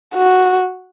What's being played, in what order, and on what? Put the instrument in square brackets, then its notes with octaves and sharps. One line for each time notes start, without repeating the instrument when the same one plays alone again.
[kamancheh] F#4